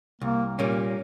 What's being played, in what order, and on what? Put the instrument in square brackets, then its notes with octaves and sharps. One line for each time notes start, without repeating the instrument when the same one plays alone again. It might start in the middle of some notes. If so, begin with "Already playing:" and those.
[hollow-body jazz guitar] C2 [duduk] A#3
[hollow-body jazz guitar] A#2 G3 A#3 C#4